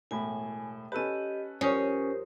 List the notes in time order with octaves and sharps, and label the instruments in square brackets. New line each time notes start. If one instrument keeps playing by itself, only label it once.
[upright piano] E1 A2 B5 [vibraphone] G#5
[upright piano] C#4 A4 B4 [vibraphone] G4 D#5
[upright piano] F2 D#6 [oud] C#4 [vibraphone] G4 A#4 C5